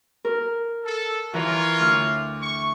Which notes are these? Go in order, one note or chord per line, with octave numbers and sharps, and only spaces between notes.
A#4
A4
E3 F4 A#4 C#5 A#5
D2 D6 F6
C#6